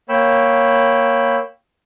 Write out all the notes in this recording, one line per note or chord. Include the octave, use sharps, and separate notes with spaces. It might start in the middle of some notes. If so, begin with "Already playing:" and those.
A#3 C#5 G5 B5 E6